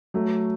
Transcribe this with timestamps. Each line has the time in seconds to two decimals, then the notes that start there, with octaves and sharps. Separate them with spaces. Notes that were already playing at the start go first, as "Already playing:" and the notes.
0.14 F#3 A3